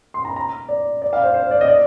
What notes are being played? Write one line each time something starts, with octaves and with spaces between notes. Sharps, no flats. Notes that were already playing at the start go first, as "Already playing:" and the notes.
C6
A#5
A#5
D5
D5
F5
C5
C5
D5
D#5
D5